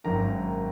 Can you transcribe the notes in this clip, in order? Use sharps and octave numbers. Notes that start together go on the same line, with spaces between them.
G#1 F#2 D#3 A#3 A#5